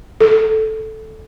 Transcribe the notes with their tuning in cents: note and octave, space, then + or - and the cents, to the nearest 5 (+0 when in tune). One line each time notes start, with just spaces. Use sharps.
A4 -5